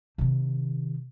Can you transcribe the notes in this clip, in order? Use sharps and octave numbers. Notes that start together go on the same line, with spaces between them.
C3 D#3